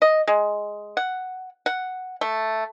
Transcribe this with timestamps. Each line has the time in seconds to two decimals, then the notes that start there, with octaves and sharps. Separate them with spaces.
0.02 D#5
0.27 G#3
0.97 F#5
1.66 F#5
2.21 A3